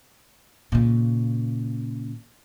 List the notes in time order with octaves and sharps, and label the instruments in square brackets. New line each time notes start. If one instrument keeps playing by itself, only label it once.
[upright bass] A#2 C#3